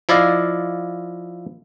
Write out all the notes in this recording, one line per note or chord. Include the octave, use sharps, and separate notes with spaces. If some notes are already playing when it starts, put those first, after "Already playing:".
F3 E4 D5 D#5 F5